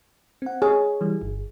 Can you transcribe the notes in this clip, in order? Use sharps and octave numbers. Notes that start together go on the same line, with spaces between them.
C4 F#5
G#4 C#5
E3 G3
G1